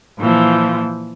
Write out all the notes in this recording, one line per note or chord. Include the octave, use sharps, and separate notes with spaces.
A#2 E3 F3